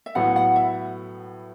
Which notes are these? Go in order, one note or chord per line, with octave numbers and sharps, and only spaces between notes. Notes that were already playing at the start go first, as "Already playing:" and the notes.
E5
A2 F#3 B3 F#5
F#5
E5